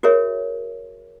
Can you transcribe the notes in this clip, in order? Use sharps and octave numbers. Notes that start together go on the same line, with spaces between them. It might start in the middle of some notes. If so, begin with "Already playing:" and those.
F#4 G#4 A#4 C#5 E5